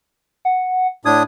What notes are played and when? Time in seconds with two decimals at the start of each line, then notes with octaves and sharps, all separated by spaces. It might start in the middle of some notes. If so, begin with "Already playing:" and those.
0.45 F#5
1.05 A2 D4 D#6 G#6